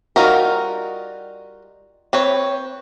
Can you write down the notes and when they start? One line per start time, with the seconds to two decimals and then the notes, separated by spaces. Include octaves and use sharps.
0.16 G3 D#4 F4 F#4 A#4
2.13 C4 B4 C#5